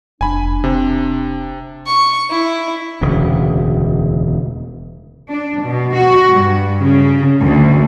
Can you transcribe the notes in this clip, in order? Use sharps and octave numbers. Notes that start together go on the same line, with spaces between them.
F1 D4 G#5 B5
C3
C#6
E4
E1 D2 C#3
D4
B2
F#4
G2
C#3
D2